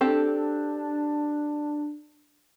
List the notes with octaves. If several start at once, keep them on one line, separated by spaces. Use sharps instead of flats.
C4 D4 G4 A4